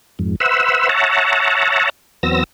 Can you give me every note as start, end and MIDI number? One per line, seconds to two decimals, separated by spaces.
0.19 0.36 41
0.19 0.36 44
0.40 0.89 71
0.40 0.89 72
0.40 0.89 76
0.40 0.89 78
0.40 0.89 88
0.89 1.90 73
0.89 1.90 76
0.89 1.90 78
0.89 1.90 81
0.89 1.90 82
2.23 2.44 40
2.23 2.44 54
2.23 2.44 59
2.23 2.44 60
2.23 2.44 88
2.23 2.44 94